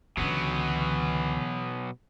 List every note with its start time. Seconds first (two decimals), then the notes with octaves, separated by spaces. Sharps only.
0.17 C#2 B2 D3 E3 F#3 B3